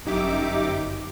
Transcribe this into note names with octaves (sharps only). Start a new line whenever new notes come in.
G1 F#2 D#4 G4 E5 D6